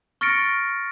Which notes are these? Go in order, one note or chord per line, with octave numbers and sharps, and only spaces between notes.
C#6 F6 A6 A#6 C#7 D7